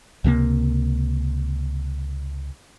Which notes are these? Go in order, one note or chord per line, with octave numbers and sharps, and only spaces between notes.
C#2 C3 A3 A#3